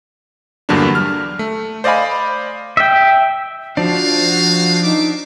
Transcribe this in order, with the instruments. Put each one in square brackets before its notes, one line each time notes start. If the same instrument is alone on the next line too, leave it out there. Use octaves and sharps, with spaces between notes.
[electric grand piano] E2 G2 D3 F#3 A#3 D4
F6
A3
C5 D5 D#5 F5 G#5 B5
[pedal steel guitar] E5 G5
[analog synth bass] F3 [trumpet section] C4 D#4 F5 [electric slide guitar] D4 [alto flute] F#4
[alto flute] D#4 [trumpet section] E5 D6